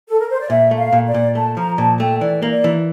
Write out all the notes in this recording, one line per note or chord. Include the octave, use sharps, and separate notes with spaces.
A4
A#4
C5
D5
A#2 E5
A3
F5
A#2
D5
A#2
A3 A5
F3 A#5
A#2 A5
A3 G5
E3 D5
A#3
D5
E3